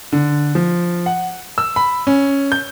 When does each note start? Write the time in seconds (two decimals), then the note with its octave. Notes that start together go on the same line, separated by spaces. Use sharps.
0.12 D3
0.55 F3
1.06 F#5
1.58 E6
1.76 B5
2.07 C#4
2.52 G6